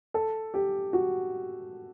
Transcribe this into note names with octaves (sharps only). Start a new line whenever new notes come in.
A4
G4
F#4